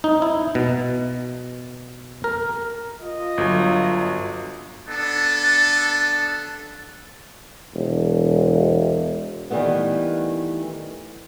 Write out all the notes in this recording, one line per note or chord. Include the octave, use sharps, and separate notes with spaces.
D#4
E4
B2
A#4
F4 D#5
G1 F#3
B3 D4 A4
E1
D#3 E3 G3 A3 B3